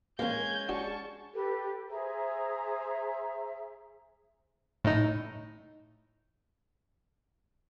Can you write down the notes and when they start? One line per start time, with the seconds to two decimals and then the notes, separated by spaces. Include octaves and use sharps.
0.19 G#3 A#3 C#4 F5 A#5 G6 G#6
0.69 D4 F#4 G#5 A5 C#6
1.34 G4 A4 B4
1.89 G#4 C5 E5 A#5
4.84 A2 D#4